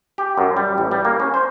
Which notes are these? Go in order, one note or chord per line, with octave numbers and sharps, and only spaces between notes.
G4
F#2
G3
A1
G3
A#3
C#4
C5